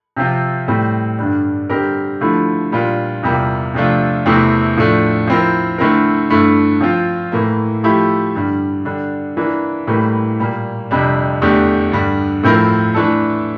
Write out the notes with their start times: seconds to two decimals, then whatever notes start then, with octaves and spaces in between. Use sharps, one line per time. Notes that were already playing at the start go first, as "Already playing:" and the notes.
0.17 C3 F3 C4 F4
0.68 A2 G3 C4
1.18 G2 D3 G3 D4
1.70 D3 G3 C4 G4 A#4
2.21 D3 F3 A3 E4
2.72 A#2 G3 D4 F4
3.23 E2 C3 G3 A#3 F4
3.74 C3 F3 A3 D4 F4
4.26 E2 C3 E3 A3 C4
4.77 A2 F3 A3 D4
5.27 F3 C4 E4 A#4
5.78 D3 A3 C4 E4 A#4
6.30 G2 D3 A3 E4
6.81 F3 C4 F4
7.32 A2 E3 A#3
7.84 F3 A3 E4 G4
8.35 G2 D3 G3
8.85 D3 G3 D4
9.37 E3 A#3 D4
9.87 A2 E3 G3 A#3
10.40 A#2 G3 A#3
10.91 F2 C3 G3 D4
11.42 E2 D3 A3 D4 G4
11.92 G2 D3 G3
12.43 A2 F3 C4 E4 A#4
12.94 E3 A3 D4 A4